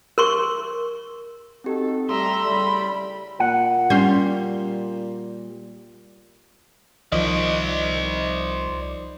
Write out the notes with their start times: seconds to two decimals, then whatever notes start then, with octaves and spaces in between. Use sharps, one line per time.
0.18 A#4 C6 C#6
1.64 C4 D#4 F#4 G4 A4
2.09 G3 A3 A4 E5 A#5 C6
2.45 A2 C#3 G3 B5
3.40 A#2 F#5
3.90 G3 C#4 C6 G6
7.12 C2 D#3 F3 C5 D5 D#5